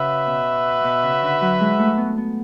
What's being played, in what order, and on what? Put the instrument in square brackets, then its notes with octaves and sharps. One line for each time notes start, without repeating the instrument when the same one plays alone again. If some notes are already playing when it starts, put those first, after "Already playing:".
Already playing: [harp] C#3 [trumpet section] F#4 B4 E5
[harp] B2
B2
C#3
D3
F#3
G#3
A3
B3
B3